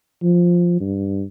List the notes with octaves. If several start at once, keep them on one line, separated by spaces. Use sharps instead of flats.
F3
G2